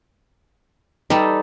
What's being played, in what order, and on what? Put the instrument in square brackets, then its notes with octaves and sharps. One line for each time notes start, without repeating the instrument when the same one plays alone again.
[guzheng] G3 G4 A4 [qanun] D#4 B4